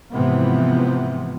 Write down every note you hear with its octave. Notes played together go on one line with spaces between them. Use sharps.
G#2 C3 E3 F3 B3